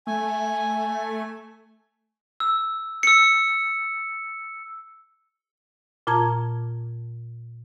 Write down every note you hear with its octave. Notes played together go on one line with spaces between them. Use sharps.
A3 G#5
E6
E6 C#7
A#2 F4 A5 A#5 G#6